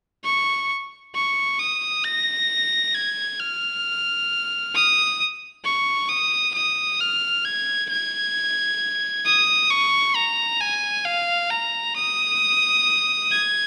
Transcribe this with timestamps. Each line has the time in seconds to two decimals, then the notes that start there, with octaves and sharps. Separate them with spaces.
0.24 C#6
1.15 C#6
1.59 D#6
2.05 A#6
2.95 G#6
3.40 F6
4.75 D#6
5.65 C#6
6.09 D#6
6.55 D#6
7.01 F6
7.45 G#6
7.90 G#6
9.26 D#6
9.71 C#6
10.15 A#5
10.61 G#5
11.06 F5
11.50 A#5
11.96 D#6
13.31 G#6